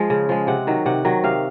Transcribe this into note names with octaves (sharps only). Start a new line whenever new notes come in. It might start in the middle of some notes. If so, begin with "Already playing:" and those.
Already playing: F3 G#3 F5
C#3
F3 G#3
C3 F#5
D#3 F#3
C3 F#5
D#3 F#3
C3 F5